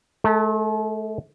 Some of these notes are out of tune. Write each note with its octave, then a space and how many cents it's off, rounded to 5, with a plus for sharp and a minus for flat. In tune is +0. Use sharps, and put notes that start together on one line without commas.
A3 -40 A4 +25